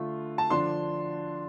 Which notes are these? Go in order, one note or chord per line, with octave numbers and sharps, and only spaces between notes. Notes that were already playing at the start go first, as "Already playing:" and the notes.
Already playing: D3 A3 F4
A5
D3 F3 D4 C6